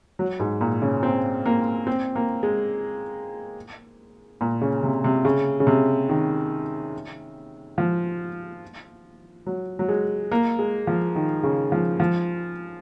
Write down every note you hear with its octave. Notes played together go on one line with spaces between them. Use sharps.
F#3
G#2
A#2
C#3
C4
A#3
C4
A#3
G#3
A#2
C#3
C3
C3
C#3
C#3
C3
D#3
F3
F#3
F#3
G#3
A#3
G#3
F3
D#3
C#3
F3
F3